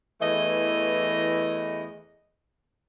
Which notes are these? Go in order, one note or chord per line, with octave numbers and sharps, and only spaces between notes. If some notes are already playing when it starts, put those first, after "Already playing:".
E2 E3 A3 D#5